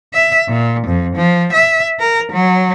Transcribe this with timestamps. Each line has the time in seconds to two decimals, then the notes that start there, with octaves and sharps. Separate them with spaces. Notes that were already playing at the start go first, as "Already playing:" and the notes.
0.14 E5
0.48 A#2
0.87 F2
1.16 F3
1.53 E5
2.00 A#4
2.32 F#3